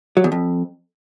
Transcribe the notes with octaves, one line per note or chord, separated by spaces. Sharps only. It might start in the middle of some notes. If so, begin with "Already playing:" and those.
F#3
E2
F2